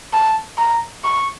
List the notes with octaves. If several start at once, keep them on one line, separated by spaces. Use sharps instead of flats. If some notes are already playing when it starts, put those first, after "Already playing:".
A5
A#5
C#6